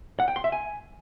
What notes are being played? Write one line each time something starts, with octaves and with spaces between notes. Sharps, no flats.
F#5
G5
C6
E5
G#5